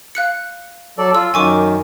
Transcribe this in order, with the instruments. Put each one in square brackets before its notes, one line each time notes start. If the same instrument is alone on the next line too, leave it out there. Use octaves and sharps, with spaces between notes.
[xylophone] F5 F#6 C#7
[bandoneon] F#3 A4 D5
[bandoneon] F4 [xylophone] E6
[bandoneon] F#2 D#3 [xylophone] G#5 C#6 D6